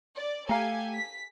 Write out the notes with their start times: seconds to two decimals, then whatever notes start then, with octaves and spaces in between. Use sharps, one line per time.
0.16 D5
0.49 A3 G4 A4 F5 G#5 A#5
0.94 B6